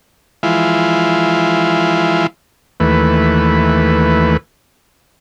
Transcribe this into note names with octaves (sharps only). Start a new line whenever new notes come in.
E3 F3 G#3 E4 F4
D#2 E3 A3 B4